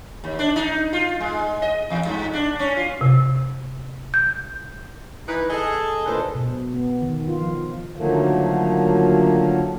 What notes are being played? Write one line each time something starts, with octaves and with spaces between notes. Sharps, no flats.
D#2
D4
D#4
F4
G#3
D#5
E2
G2
D4
C#4
F4
C3
G6
E3 D#4 B4
G#4 A4 D#5
D2 A#2 D#3 A4 B4 C5
B2
B3
D#3
F4
F3
D3 D#3 F3 F#3 A3 A#3